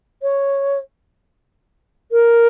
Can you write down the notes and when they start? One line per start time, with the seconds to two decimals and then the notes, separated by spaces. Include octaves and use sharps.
0.22 C#5
2.12 A#4